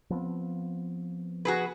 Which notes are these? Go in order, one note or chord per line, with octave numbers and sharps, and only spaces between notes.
F3 B3 C4
F#4 G#4 B4